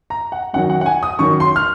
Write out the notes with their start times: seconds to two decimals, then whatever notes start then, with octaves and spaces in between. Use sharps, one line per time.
0.10 A#5
0.32 F#5
0.53 F#2 D#3 F#3 F#5
0.70 F#5
0.81 F#5
0.86 G#5
1.03 D#6
1.19 F#2 D#3 F#3 C#6
1.40 C6
1.56 F6